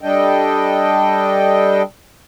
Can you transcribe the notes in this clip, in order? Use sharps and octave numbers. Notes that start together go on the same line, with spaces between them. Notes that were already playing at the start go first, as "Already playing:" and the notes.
G3 D4 A4 D#5 G5